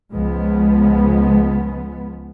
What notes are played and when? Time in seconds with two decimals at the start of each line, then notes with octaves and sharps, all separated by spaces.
0.13 C#2 F3 G#3 B3